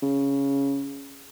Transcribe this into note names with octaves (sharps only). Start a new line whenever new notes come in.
C#3